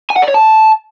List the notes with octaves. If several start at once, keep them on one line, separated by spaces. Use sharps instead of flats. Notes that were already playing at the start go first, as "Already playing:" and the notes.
G#5
F#5
D5
C#5
A5